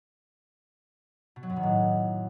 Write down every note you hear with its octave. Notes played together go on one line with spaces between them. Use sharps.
B2
F#3
F#2
D#3
A2